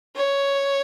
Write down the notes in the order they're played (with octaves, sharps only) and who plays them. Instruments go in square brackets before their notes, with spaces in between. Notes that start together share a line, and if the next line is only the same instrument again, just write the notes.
[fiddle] C#5